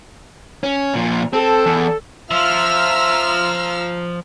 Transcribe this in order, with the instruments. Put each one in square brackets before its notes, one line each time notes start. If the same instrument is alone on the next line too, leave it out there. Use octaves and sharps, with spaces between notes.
[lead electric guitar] C#4
A#2 F3
[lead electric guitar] C4 [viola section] A4
[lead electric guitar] E2
[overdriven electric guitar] F3 [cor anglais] F4 [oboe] E5 [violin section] A#5 E6 F6